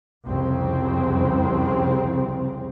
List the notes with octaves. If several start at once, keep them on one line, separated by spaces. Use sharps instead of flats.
C2 F2 C#3 C4